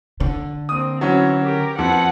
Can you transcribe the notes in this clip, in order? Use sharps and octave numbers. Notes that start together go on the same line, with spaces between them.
D3
A#3 C4 D#6
E3 F#3 C#4
G4 A#4
F2 B4 F#5